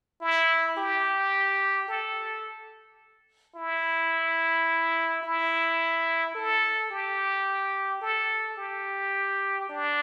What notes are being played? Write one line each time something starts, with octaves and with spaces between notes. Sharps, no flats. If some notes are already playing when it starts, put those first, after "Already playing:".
E4
G4
A4
E4
E4
A4
G4
A4
G4
D4